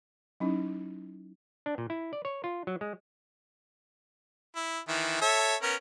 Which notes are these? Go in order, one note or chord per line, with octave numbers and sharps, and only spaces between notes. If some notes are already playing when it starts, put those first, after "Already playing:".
F#3 C#4 D#4 E4
D4
A#2
E4
D5
C#5
F4
F#3
G#3
E4
D#3 E3 E5
A4 C#5 E5
B3 C#4 A#4